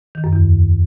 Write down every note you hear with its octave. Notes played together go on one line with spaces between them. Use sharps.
D#3
F#2
E2